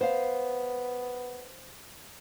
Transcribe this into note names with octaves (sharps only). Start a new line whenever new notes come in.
B3 C5 F5